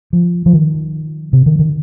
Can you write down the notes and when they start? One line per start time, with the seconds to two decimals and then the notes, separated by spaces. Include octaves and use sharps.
0.13 F3
0.46 F3
0.53 D#3
1.33 C3
1.46 D#3
1.59 D#3